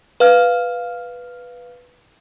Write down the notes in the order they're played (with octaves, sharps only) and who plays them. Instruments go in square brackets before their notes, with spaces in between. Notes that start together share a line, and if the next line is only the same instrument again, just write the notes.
[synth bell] B4 F5 F6